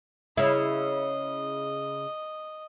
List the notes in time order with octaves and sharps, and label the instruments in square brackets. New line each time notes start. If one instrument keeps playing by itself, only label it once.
[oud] C#3 E4 [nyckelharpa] D#5